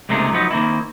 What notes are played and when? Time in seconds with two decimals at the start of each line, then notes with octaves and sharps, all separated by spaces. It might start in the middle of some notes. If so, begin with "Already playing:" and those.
0.09 C#2 C3 A3 A#3 D#4 G#4
0.32 F3 F#3 B3 D#4
0.51 D#3 A#3 C4 E4